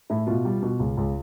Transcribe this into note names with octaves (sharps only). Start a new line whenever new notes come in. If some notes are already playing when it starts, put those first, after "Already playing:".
A2 E4
B2 F4
G3
B2
C#2
C#2